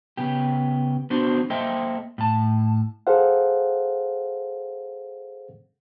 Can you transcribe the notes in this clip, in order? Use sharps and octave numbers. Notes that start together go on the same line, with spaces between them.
C#3 B3 G4
B3 D4 F#4 C5
A#3 A4 C5 D#5 E5 G5
A2 A5
G#4 A4 C5 F5 F#5